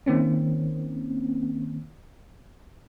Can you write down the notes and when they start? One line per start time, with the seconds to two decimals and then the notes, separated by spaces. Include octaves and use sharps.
0.06 D#3 A#3 C4 C#4